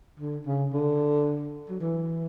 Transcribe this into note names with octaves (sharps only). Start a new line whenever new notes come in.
D3
C#3
D3
F#3
E3